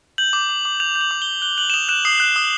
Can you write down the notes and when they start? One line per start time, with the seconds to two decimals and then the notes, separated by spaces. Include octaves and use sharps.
0.18 G6 F#7
0.33 D6
0.49 D6
0.65 D6
0.80 G6 F7
0.96 G6
1.01 F#7
1.11 D6
1.22 G7
1.27 G6
1.42 F#6 G7
1.57 F#6 F#7
1.70 E7
1.74 D#6 F7
1.89 F#6 E7
2.05 D#6 C7
2.20 F#6
2.36 D#6